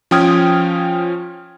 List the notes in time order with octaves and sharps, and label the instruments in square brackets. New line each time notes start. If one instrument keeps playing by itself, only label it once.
[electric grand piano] F3 C#4 G5 D#6 F6 G#6